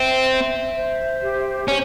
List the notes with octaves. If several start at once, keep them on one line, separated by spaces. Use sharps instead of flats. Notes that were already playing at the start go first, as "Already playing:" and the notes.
Already playing: C4 E5
E5
C5
G4
C#4 G4